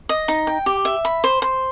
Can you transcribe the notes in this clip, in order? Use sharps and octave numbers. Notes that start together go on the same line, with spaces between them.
D#5
D#4
G5
G4
E5
B5
C5
C5